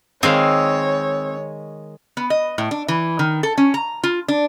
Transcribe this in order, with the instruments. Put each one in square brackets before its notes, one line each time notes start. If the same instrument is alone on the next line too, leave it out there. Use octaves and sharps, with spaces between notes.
[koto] D#3 G#3 F5 [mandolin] C4 [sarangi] C#5
[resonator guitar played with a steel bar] B3
D#5
A2
D4
E3
D#3
A4
C#4
A#5
F4
D4